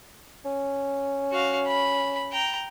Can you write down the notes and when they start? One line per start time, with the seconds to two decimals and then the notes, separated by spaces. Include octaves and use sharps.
0.45 C#4
1.32 F#4 F5
1.67 B5
2.32 G5 A#5